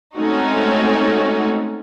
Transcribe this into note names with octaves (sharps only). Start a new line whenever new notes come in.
G#3 A3 C4 C#4 D#4 F#4